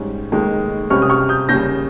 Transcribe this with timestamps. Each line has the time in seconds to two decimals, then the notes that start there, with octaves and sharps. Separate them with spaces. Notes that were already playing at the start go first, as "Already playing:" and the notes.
Already playing: G#2 G3 C#4
0.32 F1 D#2 D#3 G#3
0.90 C#2 C3 G3 C#4 C#6 F6
1.02 D#6
1.10 C#6 F6
1.29 D#6 G6
1.49 D#2 C#3 G3 G6 A#6